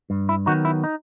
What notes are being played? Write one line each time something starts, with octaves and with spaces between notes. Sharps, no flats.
G2
E4
D#3 F#3 B3 D#4 F#4
E4
D#4